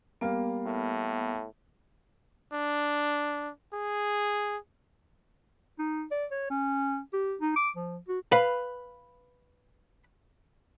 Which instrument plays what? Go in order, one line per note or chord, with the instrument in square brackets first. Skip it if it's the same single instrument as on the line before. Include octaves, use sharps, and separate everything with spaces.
[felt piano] G3 A#3 F5 [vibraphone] B3
[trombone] A2
[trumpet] D4
G#4
[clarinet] D#4
D5
C#5
C#4
G4
D#4
D6
F3
F#4
[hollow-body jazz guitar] B4 F5 B5